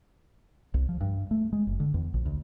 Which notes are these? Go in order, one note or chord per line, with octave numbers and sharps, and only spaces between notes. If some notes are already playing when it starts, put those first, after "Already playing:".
C2
F3
G2
A3
G#3
F#1
D3
E2
A#1
D2